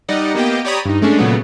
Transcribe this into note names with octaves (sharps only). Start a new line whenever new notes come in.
G3 D#4 D5 D#5 F#5
A#3 B3 G4 D#5 G5
G4 C#5 D5 A#5 B5 D#6
G2 D#4
G#3 A3 C#4 D4
A#2 C#3 F#3 A3 B3